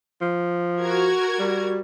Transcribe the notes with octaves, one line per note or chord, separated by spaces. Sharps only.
F3
F#4 A#4 G#6
G3